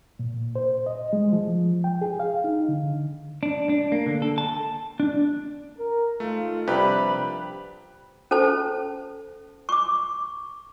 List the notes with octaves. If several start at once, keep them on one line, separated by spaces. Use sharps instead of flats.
A#2
C5
D#5
G#3
F3
G5
G#4
F5
D#4
D3
D4
D4
A#3
D3
A4
A5
D4
A#4
G#2 D#3 A3 F4
C2 F3 D4 G4 B4 B5
C#4 A4 C5 A5
C#6 D6